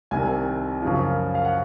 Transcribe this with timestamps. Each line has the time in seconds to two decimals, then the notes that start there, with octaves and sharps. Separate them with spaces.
0.11 C2 C3 D#3 G#5
0.82 F#2 C#3 F3
1.35 F5
1.45 F#5